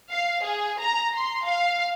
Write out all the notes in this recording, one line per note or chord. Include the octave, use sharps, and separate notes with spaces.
F5
G#4
A#5
C6
F5